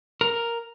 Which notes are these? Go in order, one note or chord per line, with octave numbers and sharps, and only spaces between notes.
A#4